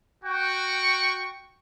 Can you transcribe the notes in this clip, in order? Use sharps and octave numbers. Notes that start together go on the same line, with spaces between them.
F#4 G5 C#6